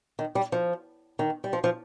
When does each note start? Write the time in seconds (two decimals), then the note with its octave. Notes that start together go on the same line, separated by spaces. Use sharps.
0.19 D#3
0.35 G3
0.52 F3
1.19 D#3
1.44 G3
1.53 F3
1.64 F3